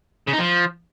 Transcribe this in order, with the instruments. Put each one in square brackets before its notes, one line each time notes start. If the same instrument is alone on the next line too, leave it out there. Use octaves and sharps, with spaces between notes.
[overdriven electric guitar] C#3
D#4
F3